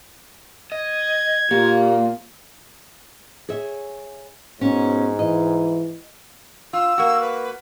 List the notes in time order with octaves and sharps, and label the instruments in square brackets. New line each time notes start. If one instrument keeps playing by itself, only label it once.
[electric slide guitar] D#5 [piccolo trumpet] G#6
[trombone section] A#2 F4 [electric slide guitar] A#3 [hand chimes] G4
[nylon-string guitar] G#4 C#5 E5
[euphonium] G#2 [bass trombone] B2 [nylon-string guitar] C#4
[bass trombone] E3 [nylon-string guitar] D#5
[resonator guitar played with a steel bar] F4 [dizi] E6
[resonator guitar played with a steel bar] A#3 F#4
[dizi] B4